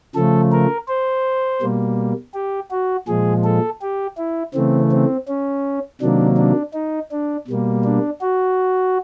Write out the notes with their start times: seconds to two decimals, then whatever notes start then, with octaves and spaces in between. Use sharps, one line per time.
0.15 C#3 F3 A3 A4
0.52 A#4
0.88 C5
1.62 B2 G3 A#3
2.34 G4
2.71 F#4
3.08 A#2 F3 G#3 G#4
3.44 A4
3.81 G4
4.17 E4
4.54 C#3 E3 A3 C4
4.91 C4
5.28 C#4
6.01 C3 D#3 F#3 A#3 D4
6.37 D4
6.74 D#4
7.11 D4
7.47 B2 G3 A#3
7.84 D4
8.21 F#4